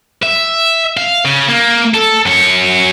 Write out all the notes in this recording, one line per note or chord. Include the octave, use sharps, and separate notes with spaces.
E5
F5
C#3
A#3
A4
F#2 C#5